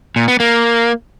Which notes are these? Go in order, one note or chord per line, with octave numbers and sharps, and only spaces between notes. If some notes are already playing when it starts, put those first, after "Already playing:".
A#2
B3
A#3